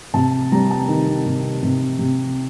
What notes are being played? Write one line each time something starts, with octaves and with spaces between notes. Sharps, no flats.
C3 A5
G3 A#5
A5
D#3
C3
C3
C3